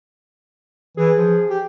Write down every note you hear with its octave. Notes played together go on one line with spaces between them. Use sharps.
E3 G#4
F3
G4